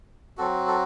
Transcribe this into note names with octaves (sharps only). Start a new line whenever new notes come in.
F#3 C4 F#4 A4
A4